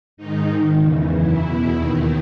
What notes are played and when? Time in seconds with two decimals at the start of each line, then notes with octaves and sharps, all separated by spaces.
0.17 G#2 D#3 D#4
0.48 G#2 D#3
0.80 E2 C#3 E3
1.11 F#2 E3 E4
1.42 E2 B2
1.74 D#2 D#3